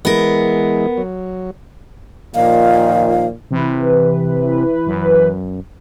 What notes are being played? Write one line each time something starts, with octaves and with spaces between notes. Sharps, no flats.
E3 G#3 B3 A#4
F#3
A#2 D#3 F3 F5
C3 E3 B4
F#2